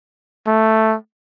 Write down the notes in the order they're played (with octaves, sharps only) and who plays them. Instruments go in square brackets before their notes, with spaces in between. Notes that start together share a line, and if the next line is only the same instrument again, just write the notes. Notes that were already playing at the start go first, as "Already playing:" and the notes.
[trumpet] A3